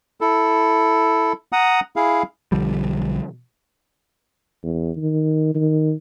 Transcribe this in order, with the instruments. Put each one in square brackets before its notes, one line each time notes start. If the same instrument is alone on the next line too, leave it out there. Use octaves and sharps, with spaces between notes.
[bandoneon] E4 A4
F#5 A#5 D#6
E4 G#4 F5
[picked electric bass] B1 D3 F3 G3
[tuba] E2
D#3
D#3